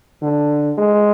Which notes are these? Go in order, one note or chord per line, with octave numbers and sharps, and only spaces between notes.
D3
G#3